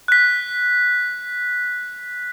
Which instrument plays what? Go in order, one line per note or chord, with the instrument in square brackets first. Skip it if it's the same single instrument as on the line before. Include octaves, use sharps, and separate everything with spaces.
[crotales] F#6 B6